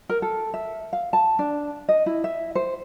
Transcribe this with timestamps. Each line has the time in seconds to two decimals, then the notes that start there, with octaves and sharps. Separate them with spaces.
0.09 A#4
0.22 A4
0.54 E5
0.93 F5
1.13 A5
1.39 D4
1.89 D#5
2.06 E4
2.24 E5
2.55 C5